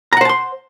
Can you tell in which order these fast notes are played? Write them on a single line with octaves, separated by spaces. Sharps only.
A#5 F#5 C5 A5 C6